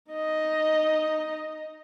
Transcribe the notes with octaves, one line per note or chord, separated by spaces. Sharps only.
D#4 D#5